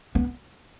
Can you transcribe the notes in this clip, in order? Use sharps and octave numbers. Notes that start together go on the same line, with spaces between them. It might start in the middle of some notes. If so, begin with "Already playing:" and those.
B3